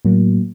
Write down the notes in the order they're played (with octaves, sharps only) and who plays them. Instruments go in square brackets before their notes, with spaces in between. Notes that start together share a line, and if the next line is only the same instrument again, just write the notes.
[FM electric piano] A2 F#3 A#3